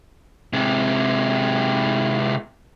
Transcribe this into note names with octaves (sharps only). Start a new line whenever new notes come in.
C3 G#3